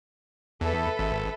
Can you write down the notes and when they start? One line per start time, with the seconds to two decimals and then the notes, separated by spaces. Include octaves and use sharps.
0.61 E2 A4 B4 E5
0.99 G#1